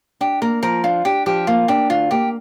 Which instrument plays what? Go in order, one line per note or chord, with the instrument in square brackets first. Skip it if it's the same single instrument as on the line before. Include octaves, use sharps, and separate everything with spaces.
[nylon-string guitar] D4 [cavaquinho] G4
[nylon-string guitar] A#3 [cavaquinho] A#4
[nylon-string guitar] F3 [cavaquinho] A#4
[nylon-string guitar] D4 [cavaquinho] F4
[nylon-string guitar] D4 [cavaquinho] G4
[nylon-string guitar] F3 [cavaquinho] G4
[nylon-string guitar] A#3 [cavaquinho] F4
[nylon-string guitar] D4 [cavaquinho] G4
[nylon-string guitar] D2 [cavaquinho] F4
[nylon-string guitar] A#3 [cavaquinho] G4